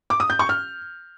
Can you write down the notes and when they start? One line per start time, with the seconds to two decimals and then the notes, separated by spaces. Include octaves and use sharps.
0.10 D6
0.20 D#6
0.30 G6
0.39 C#6
0.49 F6